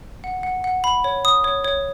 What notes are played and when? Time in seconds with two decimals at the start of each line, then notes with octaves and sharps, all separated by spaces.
0.24 F#5
0.43 F#5
0.64 F#5
0.84 B5
1.04 C#5
1.25 D#6
1.44 C#5
1.65 C#5